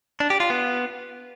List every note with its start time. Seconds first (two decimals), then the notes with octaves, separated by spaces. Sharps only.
0.20 D4
0.30 G4
0.40 F4
0.50 B3